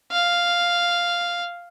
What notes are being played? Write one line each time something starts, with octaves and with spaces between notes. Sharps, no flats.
F5